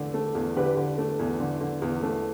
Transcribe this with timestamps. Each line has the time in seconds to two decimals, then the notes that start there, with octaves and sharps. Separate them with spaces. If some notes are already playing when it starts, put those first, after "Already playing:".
Already playing: E2 D3 A3
0.14 A3
0.35 E2
0.56 D3 G4 B4
0.77 D3
0.98 A3
1.19 E2
1.40 D3
1.61 D3
1.82 E2
2.03 A3